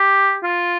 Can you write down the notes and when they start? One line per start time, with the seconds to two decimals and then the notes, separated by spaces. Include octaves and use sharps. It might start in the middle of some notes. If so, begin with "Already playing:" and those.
Already playing: G4
0.43 F4